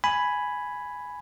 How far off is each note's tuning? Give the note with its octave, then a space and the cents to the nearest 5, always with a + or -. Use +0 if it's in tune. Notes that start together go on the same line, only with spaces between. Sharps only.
G#5 +5 B5 +0